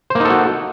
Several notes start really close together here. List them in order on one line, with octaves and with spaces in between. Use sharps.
C5 A#3 D#4 A4 F#4